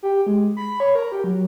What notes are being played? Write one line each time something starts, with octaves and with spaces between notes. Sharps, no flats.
G4
G#3
B5
C#5
A#4
G4
F#3